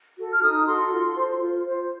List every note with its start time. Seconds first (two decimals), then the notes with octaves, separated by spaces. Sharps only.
0.17 F#4 A4
0.31 F6
0.42 D#4 D#6
0.66 F#4 A4 C6
0.91 F4
1.16 C5
1.40 F4
1.65 C5